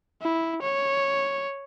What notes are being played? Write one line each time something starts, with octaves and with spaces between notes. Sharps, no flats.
E4
C#5